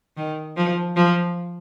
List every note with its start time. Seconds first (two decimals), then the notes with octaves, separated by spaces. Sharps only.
0.17 D#3
0.57 F3
0.96 F3